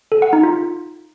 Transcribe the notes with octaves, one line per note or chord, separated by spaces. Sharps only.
A4
F#5
D#4
F4